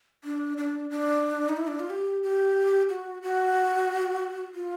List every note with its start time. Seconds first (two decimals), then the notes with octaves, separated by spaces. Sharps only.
0.24 D4
0.58 D4
0.90 D4
1.49 D#4
1.57 E4
1.67 D4
1.80 F4
1.90 G4
2.23 G4
2.89 F#4
3.22 F#4
4.55 F4